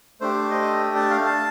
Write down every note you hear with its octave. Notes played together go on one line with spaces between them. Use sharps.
A3 D4 G4 C5
D#5
A5
F5
A5